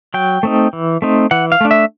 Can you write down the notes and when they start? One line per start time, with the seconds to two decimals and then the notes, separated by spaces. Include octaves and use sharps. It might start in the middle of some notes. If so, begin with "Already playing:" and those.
0.14 F#3 G5
0.43 A3 C4 D#4
0.73 E3
1.02 A3 C4 D#4
1.31 E3 F#5
1.52 F5
1.61 A3 D4
1.71 E5